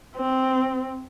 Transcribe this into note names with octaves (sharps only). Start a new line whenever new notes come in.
C4